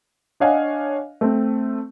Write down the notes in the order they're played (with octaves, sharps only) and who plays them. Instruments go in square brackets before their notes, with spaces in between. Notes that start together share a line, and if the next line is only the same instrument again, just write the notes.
[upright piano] D4 C#5 D#5 F5 F#5 G#5
A3 C4